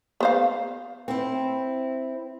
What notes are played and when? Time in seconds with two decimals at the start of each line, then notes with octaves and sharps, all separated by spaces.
0.20 B3 C5 F5
1.08 C4 E4